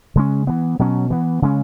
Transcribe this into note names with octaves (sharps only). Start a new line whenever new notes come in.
C#3 G#3 C#4
E3 B3
B2 F#3 C#4
E3 B3
C#3 G#3 C#4